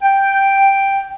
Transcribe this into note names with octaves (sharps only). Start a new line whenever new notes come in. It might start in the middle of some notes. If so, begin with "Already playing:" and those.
G5